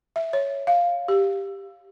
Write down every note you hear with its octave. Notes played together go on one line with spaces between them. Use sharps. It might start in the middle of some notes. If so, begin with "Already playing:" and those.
E5
C#5
F5
G4